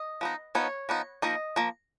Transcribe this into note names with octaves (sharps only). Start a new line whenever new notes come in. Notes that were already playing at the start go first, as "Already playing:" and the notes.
Already playing: D#5
F3 B3 D#4
F3 B3 D#4 C#5
F3 B3 D#4
F3 A#3 D#4 D#5
F3 A#3